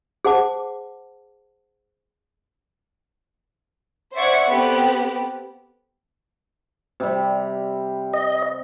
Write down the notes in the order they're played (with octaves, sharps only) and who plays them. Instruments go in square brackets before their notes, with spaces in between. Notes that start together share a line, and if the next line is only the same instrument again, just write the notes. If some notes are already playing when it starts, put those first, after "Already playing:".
[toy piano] G#4 C5 F#5 A5 D6
[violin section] C5 D5 E5 F#5 C#6 G#6
B3 C4 G4 A4
[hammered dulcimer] C3 G3
[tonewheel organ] D#5